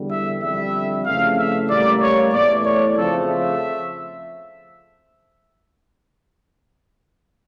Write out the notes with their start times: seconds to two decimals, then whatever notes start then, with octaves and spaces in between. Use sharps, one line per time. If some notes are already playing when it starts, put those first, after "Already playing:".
Already playing: E2 D3 G3
0.10 E5
0.42 F2 D3 G3 E5
1.05 F2 C#3 E3 A3 F5
1.37 E5
1.69 A2 G3 A#3 D5
2.00 C#5
2.32 E2 E3 A3 D5
2.64 C#5
2.96 F2 C#3 F3 A3 A4
3.27 E5